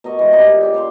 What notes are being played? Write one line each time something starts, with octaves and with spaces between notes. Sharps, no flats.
B2 A#4 D#5 C#6
E3 G#3
C3 G3 D#4 G4
A#2
C#3 D5 G5
C5 F5 C6